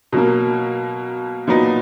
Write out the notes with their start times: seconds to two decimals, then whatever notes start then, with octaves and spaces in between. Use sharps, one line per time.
0.13 B2 F#3 A#3
1.47 A#2 F#3 B3 D#4